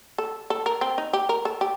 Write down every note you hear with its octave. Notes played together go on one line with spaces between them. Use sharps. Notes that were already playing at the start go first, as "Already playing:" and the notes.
A4
A4
A#4
C4
D#4
G4
A#4
A4
G4